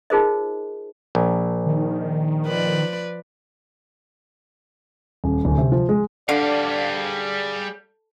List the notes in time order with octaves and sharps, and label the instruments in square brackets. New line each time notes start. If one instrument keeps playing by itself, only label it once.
[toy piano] D#4 F4 G#4 A#4 C5 D#5
[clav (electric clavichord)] A#1
[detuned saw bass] D#3
[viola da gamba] F3 B4 D5
[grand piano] D#1
D1
C3
F3
G#3
[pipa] D3 [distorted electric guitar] G3 F5 [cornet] D5
[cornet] G#4